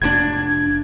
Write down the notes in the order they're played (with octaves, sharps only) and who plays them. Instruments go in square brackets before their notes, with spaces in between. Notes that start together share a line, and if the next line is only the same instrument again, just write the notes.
[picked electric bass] F1 A2 D4 [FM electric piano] G#6